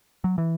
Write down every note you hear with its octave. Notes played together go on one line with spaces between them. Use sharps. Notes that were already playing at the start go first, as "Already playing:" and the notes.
F#3
E3